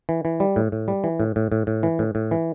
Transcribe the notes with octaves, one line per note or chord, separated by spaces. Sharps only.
E3
E3
G3
A2
A2
G3
E3
A2
A2
A2
A2
E3
A2
A2
E3